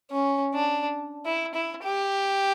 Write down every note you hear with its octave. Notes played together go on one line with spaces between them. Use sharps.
C#4
D4
E4
E4
G4